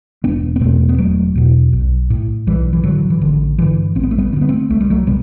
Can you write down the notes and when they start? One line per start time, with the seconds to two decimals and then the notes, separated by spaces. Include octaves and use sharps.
0.24 E1 B3 D4
0.56 B3
0.61 E2 B2 A3 C4
0.89 B3
0.98 E1 F#3 A3
1.35 E2 B2
1.73 B1
2.10 A2
2.47 B1 E3 G3
2.73 E3
2.84 A2 D3 F#3
3.10 E3
3.21 A1 D3
3.58 G2 D3 E3
3.95 A1 C4
4.03 B3
4.11 A3
4.18 G3 B3
4.32 D3 C4
4.36 G2
4.41 B3
4.49 A3 C4
4.70 C2 A3
4.80 G3
4.90 F#3 A3
5.07 C3 G3 B3